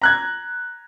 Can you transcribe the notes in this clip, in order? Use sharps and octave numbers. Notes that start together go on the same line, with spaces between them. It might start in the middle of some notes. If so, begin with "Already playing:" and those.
A#5 F#6 G#6